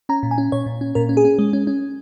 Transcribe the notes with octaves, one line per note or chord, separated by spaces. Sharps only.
C#4 A#5
A#2
G#5
C#4
A#2 C#5
A#2
C#4
A#2 A#4
C#4
G#4
C#4
G#3
C#4
C#4